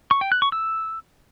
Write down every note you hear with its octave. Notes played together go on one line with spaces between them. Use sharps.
C#6
G5
F#6
C#6
E6